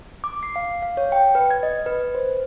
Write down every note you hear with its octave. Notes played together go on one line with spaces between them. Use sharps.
D6
C7
F5
F5
C#5
G5
B4
G#6
D#5
B4
B4
C5